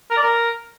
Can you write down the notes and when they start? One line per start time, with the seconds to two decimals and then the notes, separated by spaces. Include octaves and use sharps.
0.10 A#4
0.17 D5
0.23 A#4